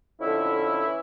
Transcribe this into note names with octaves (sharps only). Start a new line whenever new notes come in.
F2 D3 C#4 E4
E3